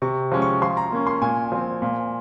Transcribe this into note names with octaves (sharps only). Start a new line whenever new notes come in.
C3 C#6
F3 G#3 C#4
C#6
F3 C6
A#5
A#3 C#4
C6
A#2 G#5
F3 C4
A#2